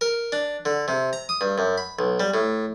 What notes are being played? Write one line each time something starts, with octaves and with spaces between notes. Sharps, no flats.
A#4
D4
D3
C3
A#5
D#6
G2
F#2
B5
B1
G3
A2